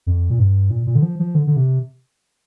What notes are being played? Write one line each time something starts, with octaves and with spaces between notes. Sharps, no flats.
F2
A#2
G2
A#2
A#2
D3
F3
F3
D3
D3
C3